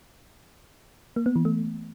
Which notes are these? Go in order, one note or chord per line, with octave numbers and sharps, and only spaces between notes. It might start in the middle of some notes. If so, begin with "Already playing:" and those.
A#3
B3
E3
A3